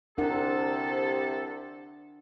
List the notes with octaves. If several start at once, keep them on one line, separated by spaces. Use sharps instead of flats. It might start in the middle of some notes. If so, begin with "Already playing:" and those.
C2 C3 D4 A4 A#4 F#5